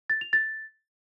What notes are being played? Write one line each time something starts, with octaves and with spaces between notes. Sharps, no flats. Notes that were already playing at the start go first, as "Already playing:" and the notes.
A6
F7
A6